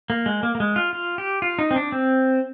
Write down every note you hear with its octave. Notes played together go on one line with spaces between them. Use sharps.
A#3
G#3
A#3
A#3
G#3
F4
F4
G4
F4
D#4
C4
D4
C4